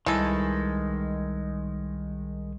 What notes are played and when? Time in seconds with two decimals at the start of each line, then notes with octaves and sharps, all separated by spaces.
0.06 C2 D#3 E3 G3 G#3 A4